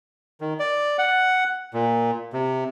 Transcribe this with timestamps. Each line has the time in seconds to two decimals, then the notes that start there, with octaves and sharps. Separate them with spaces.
0.41 D#3
0.59 D5
0.98 F#5
1.74 A#2
2.33 C3